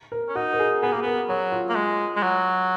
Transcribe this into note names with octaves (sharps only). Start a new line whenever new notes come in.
A#4
C#4
D#4 F#4
A#4
G#4
B3 G#4
A#3 G#4
B3 A#4
F#3 C#5
F4
A#3
G#3
G#3
F#3